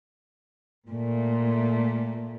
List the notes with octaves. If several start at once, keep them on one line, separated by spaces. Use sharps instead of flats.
A#2 A3